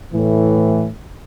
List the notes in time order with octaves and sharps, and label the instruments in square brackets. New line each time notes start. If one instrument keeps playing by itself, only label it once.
[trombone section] A2 E3